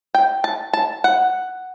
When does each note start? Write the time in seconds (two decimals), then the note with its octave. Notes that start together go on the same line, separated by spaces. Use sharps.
0.14 G5
0.44 A5
0.73 A5
1.04 F#5